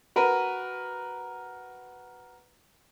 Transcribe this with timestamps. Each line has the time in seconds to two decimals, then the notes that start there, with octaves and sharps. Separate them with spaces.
0.16 F#4 A#4 B4